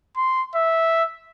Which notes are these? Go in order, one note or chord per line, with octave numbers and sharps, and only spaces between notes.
C6
E5